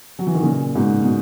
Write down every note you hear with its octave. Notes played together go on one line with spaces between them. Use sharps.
F#3
E3
D#3
A#2 C#3
G#2 B2
B2